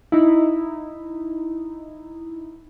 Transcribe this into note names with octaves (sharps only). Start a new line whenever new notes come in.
D#4 E4